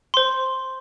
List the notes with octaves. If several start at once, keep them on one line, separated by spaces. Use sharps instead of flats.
C5 C6